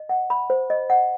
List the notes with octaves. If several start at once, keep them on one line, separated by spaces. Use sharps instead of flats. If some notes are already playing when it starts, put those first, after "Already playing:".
Already playing: D#5
F#5
B5
C5
D#5
F#5